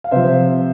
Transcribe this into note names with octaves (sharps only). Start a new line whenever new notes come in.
F5
C3 F3 C5 E5